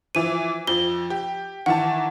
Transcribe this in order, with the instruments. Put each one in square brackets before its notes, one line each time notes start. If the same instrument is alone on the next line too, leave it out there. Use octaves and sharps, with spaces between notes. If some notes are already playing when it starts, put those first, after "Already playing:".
[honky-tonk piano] E3 F3 [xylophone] D#7
[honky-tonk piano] F2 F3 [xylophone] G7
[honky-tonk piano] G4
[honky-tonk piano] D#3 E3 A5 [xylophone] F#5